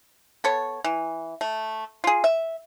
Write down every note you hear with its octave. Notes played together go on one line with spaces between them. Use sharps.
B3 A4 C#5
E3
A3
F4 G#4
E5